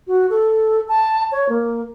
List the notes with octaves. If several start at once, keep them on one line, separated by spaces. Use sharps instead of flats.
F#4
A4
A5
C#5
A#3